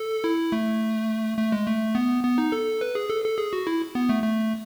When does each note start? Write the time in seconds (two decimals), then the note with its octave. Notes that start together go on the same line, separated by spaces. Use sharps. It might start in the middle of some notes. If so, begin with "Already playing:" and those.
Already playing: A4
0.24 E4
0.52 A3
1.38 A3
1.52 G#3
1.67 A3
1.95 B3
2.23 B3
2.38 D#4
2.52 A4
2.81 B4
2.95 G#4
3.10 A4
3.24 A4
3.38 G#4
3.53 F#4
3.67 E4
3.95 B3
4.09 A3
4.23 A3